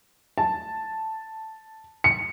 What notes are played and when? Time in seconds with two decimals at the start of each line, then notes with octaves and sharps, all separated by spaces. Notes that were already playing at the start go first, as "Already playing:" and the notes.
0.38 A5
2.04 C#7